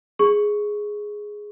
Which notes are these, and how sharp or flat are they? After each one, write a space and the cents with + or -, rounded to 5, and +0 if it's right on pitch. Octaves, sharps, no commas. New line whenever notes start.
G#4 +0 C#6 +0